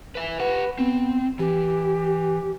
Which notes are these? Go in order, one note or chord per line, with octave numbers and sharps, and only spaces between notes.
B4 E5
G4 B4 F#5
B3 C4
E3 G4